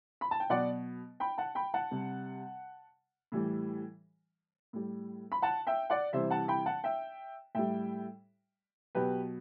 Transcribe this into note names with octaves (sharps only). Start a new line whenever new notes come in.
B5
A5
G5
B2 F#3 D5 F#5
G5 B5
F#5 A5
G5 B5
F#5 A5
C3 G3
A2 E3 G3
A2 G3
B5
F#5 A5
E5 G5
D5 F#5
C3 E3 G3 C5 E5
F#5 A5
G5 B5
F#5 A5
E5 G5
A2 G3 E5 G5
B2 F#3 G4 B4